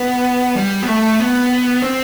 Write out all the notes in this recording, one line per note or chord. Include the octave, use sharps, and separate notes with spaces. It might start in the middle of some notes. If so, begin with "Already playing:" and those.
Already playing: B3
G3
B3
A3
B3
C4